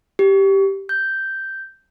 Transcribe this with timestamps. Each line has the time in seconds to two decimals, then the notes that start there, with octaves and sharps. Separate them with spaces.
0.19 G4
0.89 G6